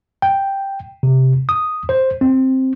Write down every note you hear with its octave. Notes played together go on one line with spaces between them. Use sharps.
G5
C3
D#6
C5
C4